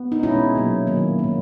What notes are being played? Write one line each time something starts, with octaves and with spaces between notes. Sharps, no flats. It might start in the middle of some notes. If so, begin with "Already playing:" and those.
Already playing: B3
D#4
B2 G#3 C#4 E4
A#2 F#3 A#3
D#3 F#3 A#3
A#2 A#3